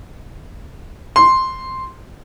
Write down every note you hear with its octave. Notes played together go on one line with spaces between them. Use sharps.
C6